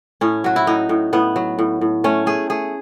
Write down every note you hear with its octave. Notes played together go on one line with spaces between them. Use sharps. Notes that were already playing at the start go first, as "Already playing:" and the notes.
A2 C#4
F#3 F#4
E4
A2 D#4
A2
A2 B3
F#3
A2
A2
A3 C#4
A3 G#4
A3 G#4